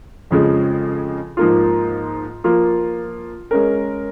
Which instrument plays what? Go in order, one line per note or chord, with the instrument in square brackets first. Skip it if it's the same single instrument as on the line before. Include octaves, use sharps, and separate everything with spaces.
[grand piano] F2 C#3 F3 G#3
G#2 F3 A#3 F4
F3 A#3 F4
G#3 C#4 A#4